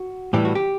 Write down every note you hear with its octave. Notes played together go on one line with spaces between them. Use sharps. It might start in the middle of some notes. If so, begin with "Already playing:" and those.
Already playing: F#4
A2 E3 G3 G4
F#4
G4